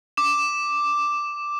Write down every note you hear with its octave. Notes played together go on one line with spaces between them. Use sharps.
D6 E7